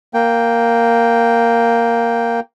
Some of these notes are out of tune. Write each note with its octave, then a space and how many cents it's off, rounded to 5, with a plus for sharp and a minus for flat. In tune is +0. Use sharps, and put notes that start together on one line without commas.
A#3 +0 G5 +0